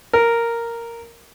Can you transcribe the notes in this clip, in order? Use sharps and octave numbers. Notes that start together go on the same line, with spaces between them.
A#4